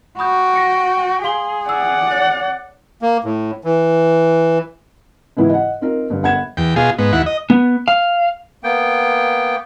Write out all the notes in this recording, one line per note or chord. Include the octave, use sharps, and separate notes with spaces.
F#4 G5 B5 D#6 G6
A#6 C#7
G#4 F5 C6 G7
D5 F#5 E6
C#5 A6
A#3
A2
E3
G#2 C#3 E3 B3 E4 F4
D#5 F#5
C4 D#4 F4 A#4
G2 D3
G1 F#5 B5 G#6 E7
E2 G5
B2 F4 G#4
G#2 B3
D#2 E4 F#5
D#5
B3
F5
A#3 B3 G5